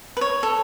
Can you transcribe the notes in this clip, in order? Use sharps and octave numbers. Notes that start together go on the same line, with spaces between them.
B4
C#5
A4